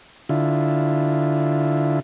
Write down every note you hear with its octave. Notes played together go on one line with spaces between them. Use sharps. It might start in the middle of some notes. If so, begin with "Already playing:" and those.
D3 E4 F4